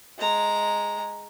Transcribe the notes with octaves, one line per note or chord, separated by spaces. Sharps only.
G#3 A#5